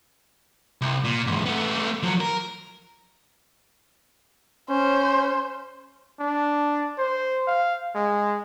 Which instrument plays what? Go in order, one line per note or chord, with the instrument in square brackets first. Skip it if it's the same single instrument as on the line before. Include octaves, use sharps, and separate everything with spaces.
[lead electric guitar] C2
A#2
E2 G#2
A3 B3
F3 F#3
A#4
[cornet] C#4 [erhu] C5
[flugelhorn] D4
C5
F5
G#3